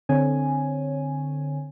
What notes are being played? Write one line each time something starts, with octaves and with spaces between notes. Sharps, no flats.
D3 C4 C#5 G#5